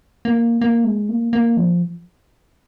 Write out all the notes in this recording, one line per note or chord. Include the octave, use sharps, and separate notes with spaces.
A#3
A#3
G#3
A#3
A#3
F3